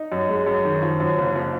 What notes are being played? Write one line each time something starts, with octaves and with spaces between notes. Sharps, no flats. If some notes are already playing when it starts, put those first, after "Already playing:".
Already playing: D#4
F#2
G#3
F#2
D#3
F3
F#2
F#1
F3